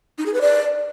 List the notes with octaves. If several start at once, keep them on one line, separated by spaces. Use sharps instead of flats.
D#4
G#4
B4
D5